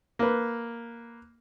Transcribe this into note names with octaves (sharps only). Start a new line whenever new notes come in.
A#3 B4